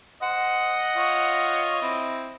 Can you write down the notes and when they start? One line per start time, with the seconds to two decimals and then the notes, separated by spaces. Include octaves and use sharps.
0.22 C5 D#5 F#5
0.95 F4 C#5
1.82 C4 E4